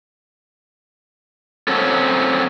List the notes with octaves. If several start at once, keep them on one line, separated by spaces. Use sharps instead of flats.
F#3 C4 C#4 A4